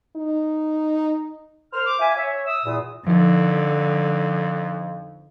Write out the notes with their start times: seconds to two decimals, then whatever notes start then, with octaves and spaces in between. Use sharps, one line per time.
0.16 D#4
1.73 A#4 C5 F6
1.85 D6
2.00 F4 E5 G#5
2.15 C#5 E5
2.46 D#6 E6
2.64 E2 A#2
3.07 F2 D3 F3 D#4